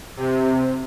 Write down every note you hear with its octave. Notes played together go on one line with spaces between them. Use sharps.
C3